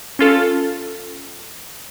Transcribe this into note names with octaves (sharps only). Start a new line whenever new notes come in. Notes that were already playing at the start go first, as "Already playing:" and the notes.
C#4 F4 A4